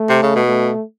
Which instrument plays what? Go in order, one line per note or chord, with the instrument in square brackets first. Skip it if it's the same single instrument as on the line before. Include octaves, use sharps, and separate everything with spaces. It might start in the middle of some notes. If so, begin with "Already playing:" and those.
Already playing: [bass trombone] A3
[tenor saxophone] C3
C#3
B2
[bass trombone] A3